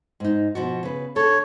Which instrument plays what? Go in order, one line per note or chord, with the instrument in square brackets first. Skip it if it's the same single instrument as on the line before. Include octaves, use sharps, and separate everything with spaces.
[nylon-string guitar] G#2 D#4
B2 F3 F#4
C#3 B4
[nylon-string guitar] D3 A4 [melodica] C#5